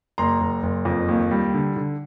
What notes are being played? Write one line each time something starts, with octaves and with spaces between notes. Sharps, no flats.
F#1 A#5 C6
F#1
F#1
F2
D#2
G3
D3
D3